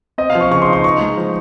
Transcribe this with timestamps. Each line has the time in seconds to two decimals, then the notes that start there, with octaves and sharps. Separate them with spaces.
0.18 C4 D#5
0.30 F5
0.35 F3
0.40 C#6
0.51 C#3 C#6
0.62 C6
0.68 D#4
0.73 C6
0.84 D#4 C#6
1.01 G#3
1.17 F3